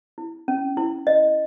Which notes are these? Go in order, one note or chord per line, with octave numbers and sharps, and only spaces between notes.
E4
C#4
E4
D#5